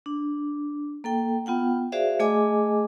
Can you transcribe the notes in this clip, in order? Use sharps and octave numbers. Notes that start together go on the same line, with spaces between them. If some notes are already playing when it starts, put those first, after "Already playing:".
D4
A#3 A4 G5
B3 F4 F#5 G5
F#4 G#4 C5 D5 E5 F5
A3 G#4 D#5 G#5 D6